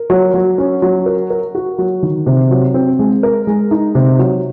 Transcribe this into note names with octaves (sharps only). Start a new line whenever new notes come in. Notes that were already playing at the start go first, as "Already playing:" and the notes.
Already playing: A#4
F#3
F#3
C#4
F#3
A#4
A#4
F#4
F#3
D#3
C3
F#3
C4
G#3
A#4
G#3
D#4
C3
F#3